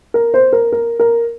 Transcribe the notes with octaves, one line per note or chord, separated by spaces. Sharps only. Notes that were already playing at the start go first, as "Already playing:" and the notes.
A#4
C5
A#4
A#4
A#4